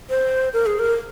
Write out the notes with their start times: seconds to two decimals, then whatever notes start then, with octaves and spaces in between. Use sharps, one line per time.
0.10 C5
0.53 A#4
0.66 G#4
0.79 A#4